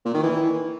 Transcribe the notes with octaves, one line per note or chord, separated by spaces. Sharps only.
A#2
D#3
E3